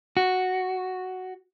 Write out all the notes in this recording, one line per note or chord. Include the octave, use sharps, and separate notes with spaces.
F#4